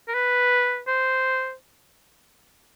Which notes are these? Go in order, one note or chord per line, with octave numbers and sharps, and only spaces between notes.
A#4
B4
C5